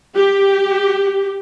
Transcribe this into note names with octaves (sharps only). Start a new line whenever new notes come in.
G4